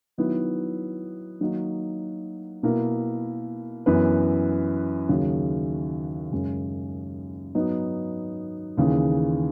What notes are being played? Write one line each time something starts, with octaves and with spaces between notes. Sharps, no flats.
D#3 F#3 B3 E4
D#3 F#3 A#3 D#4 F#4
B2 A#3 E4 A#4
F#2 E3 B3 E4 B4
D#2 C#3 F#3
F#2 C#3 G#3 C#4
G#2 F#3 B3 D#4
D#2 C#3 E3